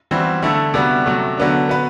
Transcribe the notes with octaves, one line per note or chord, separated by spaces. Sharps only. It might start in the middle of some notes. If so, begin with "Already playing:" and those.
E3 G3 C4 F#4
D3 A3 E4 A4
C3 G3 B3 D4 F#4
C3 F#3 A3
D3 F#3 B3 D4
B3 F#4 B4